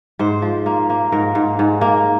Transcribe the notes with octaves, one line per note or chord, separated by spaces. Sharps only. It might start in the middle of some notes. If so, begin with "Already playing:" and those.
G#2 C5
F3
A#3
A#3
G#2 A#4
G#2
G#2
A#3